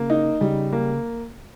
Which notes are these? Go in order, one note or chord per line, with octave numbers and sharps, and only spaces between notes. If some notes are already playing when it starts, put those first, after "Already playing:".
Already playing: C#3 A#3
D#4
C#3 G3
A#3